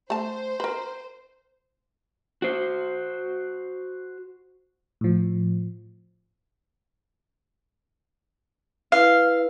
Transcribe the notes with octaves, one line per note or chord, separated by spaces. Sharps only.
A3 C5 A5
A#4 B4
F#4 C5
A2 F3
E4 B4 F5